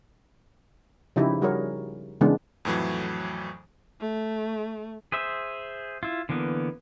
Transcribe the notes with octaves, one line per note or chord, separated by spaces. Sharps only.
C#3 F3 D#4 E4 G4
G3 F#4 G#4 A#4 C#5
C#3 E3 G#3 B3 D4 D#4
F2 A2 E3 F#3
A3
G#4 C5 E5
E4 F4
D3 E3 A#3 B3